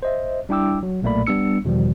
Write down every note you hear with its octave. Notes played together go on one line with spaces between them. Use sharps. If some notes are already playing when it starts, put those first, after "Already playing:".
C5 D#5 E5
G3 D4 E4 G5 D6 E6
F#3
B1 A#2 A3 A#3 D5 B5
G3 B3 D4 E6 C#7
E2 B2 D#3 F3 G3